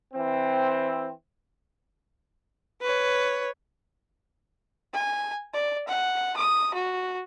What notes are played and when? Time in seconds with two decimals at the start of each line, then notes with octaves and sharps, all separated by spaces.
0.13 E3 C4
2.81 B4 C#5
4.94 G#5
5.54 D5
5.88 F#5
6.36 D#6
6.74 F#4